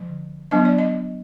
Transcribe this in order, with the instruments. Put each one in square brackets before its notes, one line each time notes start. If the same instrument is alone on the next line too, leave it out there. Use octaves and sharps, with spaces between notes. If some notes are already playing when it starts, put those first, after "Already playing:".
Already playing: [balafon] D3 F3
F#3 B3 D4 D#5
D5
D#5